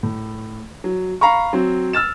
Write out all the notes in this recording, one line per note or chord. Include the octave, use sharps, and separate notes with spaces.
A2
F#3
F5 A#5 B5 C#6
F#3 C4
E6 F6 A6 E7